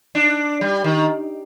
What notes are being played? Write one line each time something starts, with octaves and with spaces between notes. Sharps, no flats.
D4
G3
D#3